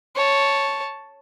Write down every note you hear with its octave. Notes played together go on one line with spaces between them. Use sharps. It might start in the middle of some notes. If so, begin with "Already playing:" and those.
C#5 A5